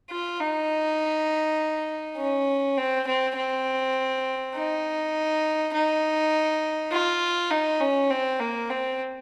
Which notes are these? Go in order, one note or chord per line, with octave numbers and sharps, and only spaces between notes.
F4
D#4
C#4
C4
C4
C4
D#4
D#4
F4
D#4
C#4
C4
A#3
C4